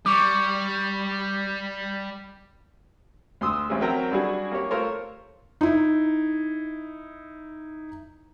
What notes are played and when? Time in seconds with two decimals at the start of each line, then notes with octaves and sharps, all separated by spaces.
0.06 G3 C#6 D6
3.41 D2 C6 D#6 E6
3.69 A1 C4 C#4 G#4
3.81 F#3 C4 A#4 E5 G5 A#5
4.11 G3 D4 E4 F#4 G#4
4.52 A#3 G4 C#5
4.71 A3 F4 A#4 C5 C#5
5.61 D#4 E4